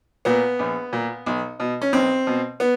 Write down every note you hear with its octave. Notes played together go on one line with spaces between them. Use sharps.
A#2 B3
A#1
A#2
B1
B2
C#4
B1 C4
B2
B3